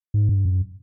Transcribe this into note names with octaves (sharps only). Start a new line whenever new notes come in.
G#2
G2
F#2